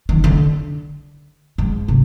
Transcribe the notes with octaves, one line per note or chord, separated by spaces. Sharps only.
D#3
D3
G#2
C3